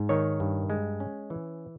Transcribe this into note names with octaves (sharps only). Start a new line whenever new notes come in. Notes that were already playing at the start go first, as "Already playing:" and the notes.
Already playing: G#2
D#3 C#5
G2
G#3
C#4
E3